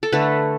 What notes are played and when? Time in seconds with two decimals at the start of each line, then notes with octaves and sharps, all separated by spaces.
0.03 A4
0.12 D3 A3 B4